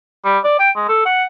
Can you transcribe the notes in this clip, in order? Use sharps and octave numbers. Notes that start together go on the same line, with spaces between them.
G3
D5
G5
G#3
A4
F#5